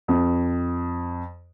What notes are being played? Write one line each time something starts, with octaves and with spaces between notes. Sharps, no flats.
F2